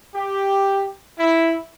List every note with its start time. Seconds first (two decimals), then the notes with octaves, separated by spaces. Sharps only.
0.15 G4
1.19 E4